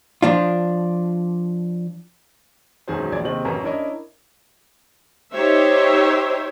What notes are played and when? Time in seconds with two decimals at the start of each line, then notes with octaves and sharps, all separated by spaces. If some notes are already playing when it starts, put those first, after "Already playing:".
0.22 F3 D4 F4
2.88 E1 F#2 D#3 G#4 C5
3.12 A#1 D5 G#5 G#6
3.24 D#2 C3 C4 G#4 D#5 F#7
3.45 A1 F#2 A#4 A#5
3.63 C#4 D4 E4 A#4 C#5 D#5
5.34 D#4 G4 C5 C#5 E5